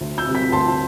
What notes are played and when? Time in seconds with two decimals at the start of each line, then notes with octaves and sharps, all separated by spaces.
0.01 D2
0.18 E6 G6
0.27 C3 G3
0.35 G6 B6
0.52 D2 A5 C6